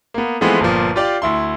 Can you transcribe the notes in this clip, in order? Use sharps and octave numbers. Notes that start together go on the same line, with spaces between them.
A#3 B3
E3 F3 G#3 A3 B3 C4
G1 A#2 F3
F4 G4 D5 F5
D2 E4 C6